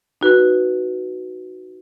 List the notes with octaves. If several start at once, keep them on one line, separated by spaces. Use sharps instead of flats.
D#4 F#4 B4